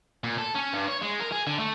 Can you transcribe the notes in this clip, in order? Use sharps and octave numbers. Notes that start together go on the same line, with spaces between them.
A#2
A4
C#4
G2
C#5
G#3
A#4
G#4
D3
A3